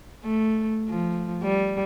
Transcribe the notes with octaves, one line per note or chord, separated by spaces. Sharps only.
A3
F3
G3